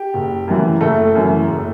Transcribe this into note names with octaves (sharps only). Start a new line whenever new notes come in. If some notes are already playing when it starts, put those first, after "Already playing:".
Already playing: G4
F#1
F#2 E3
F#1 A3 A4
F#2 E3
F#1